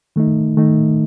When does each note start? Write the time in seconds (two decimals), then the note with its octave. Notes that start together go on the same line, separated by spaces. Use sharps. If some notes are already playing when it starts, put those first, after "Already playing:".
0.16 D#3 A3 D#4
0.57 D#3 A3 D#4